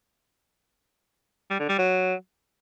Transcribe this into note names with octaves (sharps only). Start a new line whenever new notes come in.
G3
D3
G3
F#3